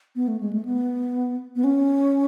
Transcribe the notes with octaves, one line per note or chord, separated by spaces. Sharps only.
B3
A3
G#3
A3
B3
B3
C#4